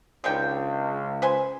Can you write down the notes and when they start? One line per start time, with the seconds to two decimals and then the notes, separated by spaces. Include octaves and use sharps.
0.24 C#2 D3 D#3 G5
1.22 B4 C5 G#5